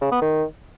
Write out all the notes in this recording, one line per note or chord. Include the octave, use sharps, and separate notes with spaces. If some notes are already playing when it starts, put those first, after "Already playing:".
C#3
B3
D#3